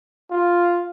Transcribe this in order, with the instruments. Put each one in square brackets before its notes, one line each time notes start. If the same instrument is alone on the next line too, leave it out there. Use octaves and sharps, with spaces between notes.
[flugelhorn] F4